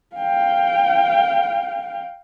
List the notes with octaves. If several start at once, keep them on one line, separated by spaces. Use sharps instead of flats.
F5 G5